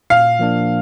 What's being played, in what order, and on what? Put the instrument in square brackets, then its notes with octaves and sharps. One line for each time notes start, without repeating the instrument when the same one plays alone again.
[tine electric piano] A#2 [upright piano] F5
[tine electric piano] F3 A#3 D4